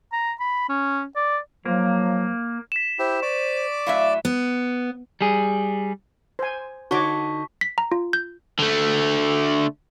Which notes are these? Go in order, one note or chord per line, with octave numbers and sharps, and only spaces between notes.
A#5
B5
C#4
D5
F3 F#3 A#3
B6 E7
E4 G4 C5
D5 C#6 D6
A2 F#3 E5 F5
B3
G3 G#4
C5 G#5
D3 D#4 F#4 C#5 A5 C#6 D6 B6
B6
A#5
F4
G6
D3 A3